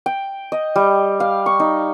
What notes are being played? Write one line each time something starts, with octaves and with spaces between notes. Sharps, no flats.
G5
D#5
G3
F5
C#6
D#4